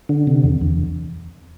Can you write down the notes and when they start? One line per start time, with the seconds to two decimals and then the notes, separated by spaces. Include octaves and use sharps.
0.09 D3
0.27 C3
0.44 E2
0.61 E2